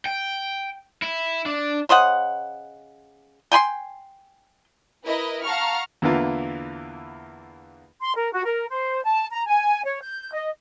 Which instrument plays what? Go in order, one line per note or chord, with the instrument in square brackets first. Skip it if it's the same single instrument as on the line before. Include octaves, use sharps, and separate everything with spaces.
[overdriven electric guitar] G5
E4
D4
[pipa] C#3 C5 D#5 F#5
G5 G#5 B5 C6
[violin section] E4 A#4 B4 D#5
F5 F#5 A5 A#5 C#6 F6
[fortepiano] E2 D3 E3 A#3 E4 F4
[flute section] C6
A#4
F#4
A#4
C5
A5
A#5
G#5
C#5
G6
D#5